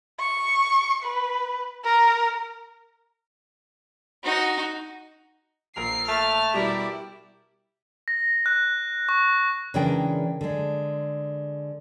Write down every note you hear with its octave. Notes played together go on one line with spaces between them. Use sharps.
C#6
B4
A#4
D#4 F#4
A#1 A#4 C7 F7
A3 A5 F6
B2 G3 E4 G4 A#4 D5
A#6
F#6
C#6
C#3 E3 G#3 D4 A#4 G5
D3 G#3